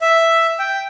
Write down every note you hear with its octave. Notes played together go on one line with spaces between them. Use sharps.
E5
G5